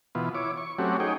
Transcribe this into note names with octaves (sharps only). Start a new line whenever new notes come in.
B2 E3 B3 F4
E4 C#5 D6
C#6
F#3 A3 C4 C#4 F#4 G4
D#4 G#4 C#5 G5